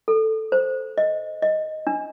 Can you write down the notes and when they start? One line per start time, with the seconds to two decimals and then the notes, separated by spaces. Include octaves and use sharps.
0.08 A4
0.52 C5
0.98 D#5
1.43 D#5
1.87 D4